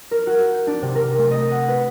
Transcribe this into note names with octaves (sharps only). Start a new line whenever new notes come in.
A#4
F#4
G6
D4
C3
A#4
A3
D#5
F#5
B4